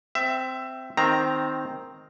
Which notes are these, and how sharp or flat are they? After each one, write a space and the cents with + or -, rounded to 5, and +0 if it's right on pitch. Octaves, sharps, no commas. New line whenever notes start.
C4 -10 E5 +15
D#3 +0 C4 +0 A#5 +0